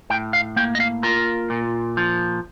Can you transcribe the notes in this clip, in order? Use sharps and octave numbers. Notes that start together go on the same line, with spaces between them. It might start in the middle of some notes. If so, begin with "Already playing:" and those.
A2 G5
F5
A#3 G5
D#5
F5
F4 A#4
A#2
F3